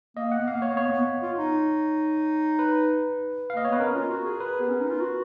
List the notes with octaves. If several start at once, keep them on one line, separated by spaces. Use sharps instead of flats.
A#3 D#5
F#5
B3
A#3 F5
C#5
A#3
B3 C#5
B3
F4
D#4
B4
F5
A#3 D#5
C#5
B3 B4
C#4 A#4
F4
F#4
G#4
B4
B3
C#4
D#4
F4
F#4